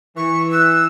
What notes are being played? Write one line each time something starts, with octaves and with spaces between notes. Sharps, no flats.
E3 C#6
E6 F#6